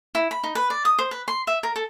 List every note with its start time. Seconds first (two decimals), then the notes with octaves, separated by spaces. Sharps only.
0.15 E4
0.31 B5
0.44 D#4
0.55 B4
0.70 D5
0.85 D#6
0.99 C5
1.11 B4
1.28 C6
1.47 E5
1.63 A#4
1.76 A4